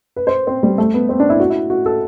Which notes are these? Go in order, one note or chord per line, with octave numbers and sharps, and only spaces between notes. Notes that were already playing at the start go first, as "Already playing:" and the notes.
B4
C5
C4
G3
A3
B3
C4
D4
E4
F#4
E4
F#4
A4